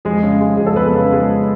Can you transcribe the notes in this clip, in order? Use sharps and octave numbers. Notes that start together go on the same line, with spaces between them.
F2 G#3 G#4
C#3
G#3
F2 G#4
A4
F2 B3 B4
C#3
G#3